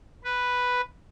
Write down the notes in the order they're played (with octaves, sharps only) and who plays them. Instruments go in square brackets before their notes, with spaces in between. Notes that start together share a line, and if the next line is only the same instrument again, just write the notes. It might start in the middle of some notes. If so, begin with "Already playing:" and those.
[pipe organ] B4